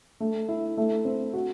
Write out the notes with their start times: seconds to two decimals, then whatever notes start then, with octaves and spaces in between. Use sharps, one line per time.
0.20 A3
0.49 E4
0.77 A3
1.05 C4
1.34 F#4